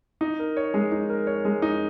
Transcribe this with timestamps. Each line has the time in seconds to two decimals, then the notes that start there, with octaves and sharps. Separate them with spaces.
0.21 D#4
0.39 A#4
0.57 C#5
0.74 G#3
0.92 D#4
1.10 A#4
1.27 C#5
1.45 G#3
1.62 D#4